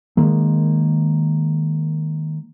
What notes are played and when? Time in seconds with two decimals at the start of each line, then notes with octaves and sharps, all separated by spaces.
0.17 D#3 G#3 A#3